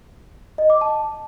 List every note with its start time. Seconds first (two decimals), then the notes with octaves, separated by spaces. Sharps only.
0.58 D#5
0.70 D6
0.81 A5